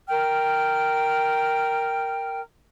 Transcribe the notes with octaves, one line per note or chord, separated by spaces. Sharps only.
A#4 G5 F6